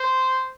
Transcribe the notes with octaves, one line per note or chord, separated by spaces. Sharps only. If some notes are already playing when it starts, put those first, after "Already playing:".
Already playing: C5